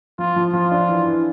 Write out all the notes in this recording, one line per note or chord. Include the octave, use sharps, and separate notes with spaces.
F3 F4
F3
F3 F4
D4
E3
E3